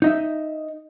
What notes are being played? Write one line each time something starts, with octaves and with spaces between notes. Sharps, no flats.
D#4 D#5 E5